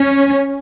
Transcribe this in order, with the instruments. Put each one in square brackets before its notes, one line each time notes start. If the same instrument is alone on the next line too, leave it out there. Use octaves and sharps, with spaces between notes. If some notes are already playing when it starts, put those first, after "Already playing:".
Already playing: [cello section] C#4